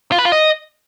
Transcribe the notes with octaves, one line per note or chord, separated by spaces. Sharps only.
F4
B4
F4
D#5